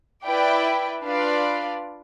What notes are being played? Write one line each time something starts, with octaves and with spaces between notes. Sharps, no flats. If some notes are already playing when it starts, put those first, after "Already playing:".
E4 B4 D5 G5
D4 F4 B4 D5 F5